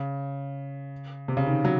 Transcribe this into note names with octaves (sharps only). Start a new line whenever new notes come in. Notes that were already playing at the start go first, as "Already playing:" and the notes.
Already playing: C#3
C3
C#3
D#3
F#3